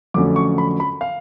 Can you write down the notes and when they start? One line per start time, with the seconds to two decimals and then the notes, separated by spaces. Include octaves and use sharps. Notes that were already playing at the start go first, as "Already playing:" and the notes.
0.14 F2 D3 F#3 A3 C#4 D6
0.36 C#6
0.58 B5
0.80 B5
1.01 F5